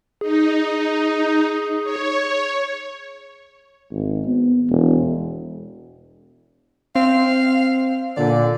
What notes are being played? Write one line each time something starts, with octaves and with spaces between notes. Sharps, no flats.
D#4 G#4
C#5
G#1
B3
E1
C4 F5
A#2 D3 D5